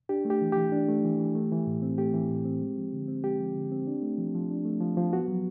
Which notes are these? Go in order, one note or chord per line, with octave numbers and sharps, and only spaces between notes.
D4 G4
A3
G4
E3
E3 G4
D4
A3
E3
E3
A3
E3
A2
C4
A3 G4
E3
A2
C4
G#3
F3
D3
C4
G#3 G4
F3
D3
C4
D4
A3
F3
F3
D4
A3
F3
F3
B3 F#4
F#3